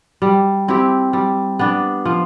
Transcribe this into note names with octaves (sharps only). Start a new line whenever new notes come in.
G3
C4 E4 G4
G3
B3 D4
F3